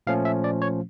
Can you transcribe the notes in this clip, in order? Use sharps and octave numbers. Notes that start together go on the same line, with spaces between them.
A#2 F3 A3 C#4 F5
E5
D5
C#5